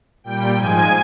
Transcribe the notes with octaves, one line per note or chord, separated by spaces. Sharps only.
A#2 G3 G5
G#2 F3 G#3 G#5